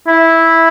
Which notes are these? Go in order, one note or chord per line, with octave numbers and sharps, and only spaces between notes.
E4